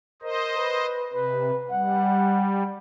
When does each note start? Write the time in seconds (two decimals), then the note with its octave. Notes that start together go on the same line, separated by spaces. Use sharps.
0.22 A#4 C5 D#5
0.57 B4
1.13 C3 B4
1.71 G3 F#5